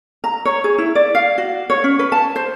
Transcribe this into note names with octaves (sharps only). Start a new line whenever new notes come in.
A#5
C#5
G#4
E4
D5
F5
F#4
C#5
C#4
B4
A5
C5